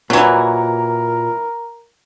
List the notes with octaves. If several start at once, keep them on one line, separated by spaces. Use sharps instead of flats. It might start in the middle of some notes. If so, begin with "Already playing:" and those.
A#2 E3 F#3 F#4 A#4